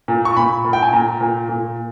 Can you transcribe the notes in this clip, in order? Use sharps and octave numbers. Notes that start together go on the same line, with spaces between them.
A#2
C#6
A#2 B5
A#2
G5
G#5
A#2 A#5
A#2
A#2